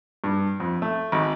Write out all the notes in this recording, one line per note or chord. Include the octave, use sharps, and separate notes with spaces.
G2
F2
A3
G#1